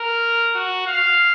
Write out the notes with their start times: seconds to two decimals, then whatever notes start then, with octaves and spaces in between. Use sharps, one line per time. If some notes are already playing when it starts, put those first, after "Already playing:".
Already playing: A#4
0.55 F#4
0.87 F5